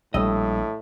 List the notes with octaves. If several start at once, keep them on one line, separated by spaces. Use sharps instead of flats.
A#1 A2 G3 A3 D#5 E6